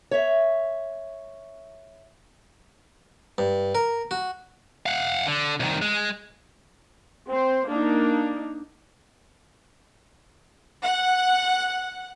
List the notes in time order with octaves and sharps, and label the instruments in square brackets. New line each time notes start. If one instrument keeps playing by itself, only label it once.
[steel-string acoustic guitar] C#5 E5
[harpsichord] G2
A#4
F#4
[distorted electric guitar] F5 F#5
D3
C2 D#3
G#3
[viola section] C4 C5
A#3 D4 D#4
[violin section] F#5